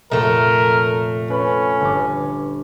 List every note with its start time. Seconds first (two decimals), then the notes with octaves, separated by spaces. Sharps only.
0.12 F1 A#2 A3 A4 A#4
1.30 C#4 B4 B5
1.80 G1 D6